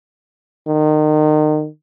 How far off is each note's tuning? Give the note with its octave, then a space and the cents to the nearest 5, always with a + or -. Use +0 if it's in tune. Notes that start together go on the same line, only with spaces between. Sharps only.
D#3 -30